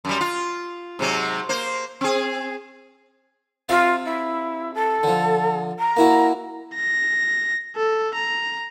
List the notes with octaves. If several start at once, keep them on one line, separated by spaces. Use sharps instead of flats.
F#2 G3
F4
G#2 C3 F#3
A#3 C5
C4 G#4
C3 F4 E5 F5
E4
A4
D3 F3
A#5
A#3 E4 F#4
A#6
A4
A#5